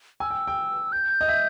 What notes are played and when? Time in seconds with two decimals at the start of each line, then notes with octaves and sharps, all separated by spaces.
0.20 G#5 E6
0.30 G5
0.47 G5
0.92 G6
1.21 D#5
1.28 E5